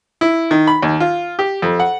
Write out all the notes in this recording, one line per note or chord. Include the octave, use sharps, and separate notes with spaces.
E4
D#3
B5
D#2
F4
G4
F2
F#5